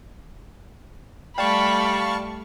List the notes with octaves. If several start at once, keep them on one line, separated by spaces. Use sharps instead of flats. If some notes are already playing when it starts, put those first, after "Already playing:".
G3 A3 D5 F5 G5 A5 B5 C#6